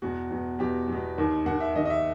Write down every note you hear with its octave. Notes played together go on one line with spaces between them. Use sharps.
E2 B2 F#4
E2 B2
E2 B2 G4
E2 B2
D#2 D#3
D#2 D#3 F#5
E5
D#2 D#3 D#5
D#5
E5